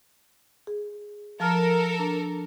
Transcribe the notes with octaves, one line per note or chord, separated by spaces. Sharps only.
G#4
F3 A4 A#4 A5 F6
D4